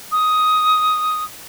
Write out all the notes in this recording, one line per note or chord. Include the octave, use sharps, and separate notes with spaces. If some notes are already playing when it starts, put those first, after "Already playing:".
D#6